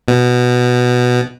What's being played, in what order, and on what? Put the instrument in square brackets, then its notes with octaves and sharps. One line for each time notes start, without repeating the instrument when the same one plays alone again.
[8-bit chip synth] B2